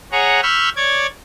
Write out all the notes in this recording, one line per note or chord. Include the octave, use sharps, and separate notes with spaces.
G#4 C#5 F#5 A#5
B5 C#6 E6 F6 G6
C#5 D5 D6 G#6